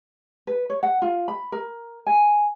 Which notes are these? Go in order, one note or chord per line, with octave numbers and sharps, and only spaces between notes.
B4
C#5
F#5
F4
B5
A#4
G#5